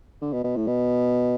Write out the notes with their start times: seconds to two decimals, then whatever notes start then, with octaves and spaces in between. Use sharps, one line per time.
0.22 D3
0.33 B2
0.44 B2
0.56 A2
0.67 B2